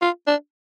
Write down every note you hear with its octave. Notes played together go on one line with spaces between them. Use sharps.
F4
D4